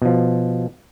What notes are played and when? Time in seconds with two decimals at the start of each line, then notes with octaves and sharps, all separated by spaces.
0.02 B2 F3